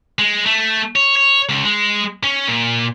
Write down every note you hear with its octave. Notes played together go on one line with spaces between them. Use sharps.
G#3
A3
C#5
C#5
C#2
G#3
C#4
A#2